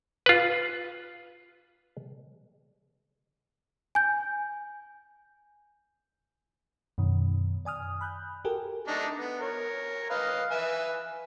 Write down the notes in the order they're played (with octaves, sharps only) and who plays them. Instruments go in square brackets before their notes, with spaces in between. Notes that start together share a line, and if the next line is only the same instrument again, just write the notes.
[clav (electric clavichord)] F4 B4
[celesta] G#5 G6
[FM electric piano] F#2 B2 D#3
D5 G#5 D#6 F6
B5 F#6 G6
F#4 G4 A4 A#4 G#5
[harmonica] A3 D4 D#4
B3
A#4 C#5
B4 D#5 F5
B4 E5 G#5